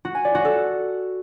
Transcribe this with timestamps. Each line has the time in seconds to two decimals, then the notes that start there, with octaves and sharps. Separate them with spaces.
0.05 F#4
0.15 G#5
0.25 D5
0.35 F#4
0.45 A4